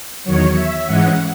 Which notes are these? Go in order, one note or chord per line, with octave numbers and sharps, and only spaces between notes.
E2 D#3 F#3 C#5
E5
G#2 E3 G#3 C#4 F#5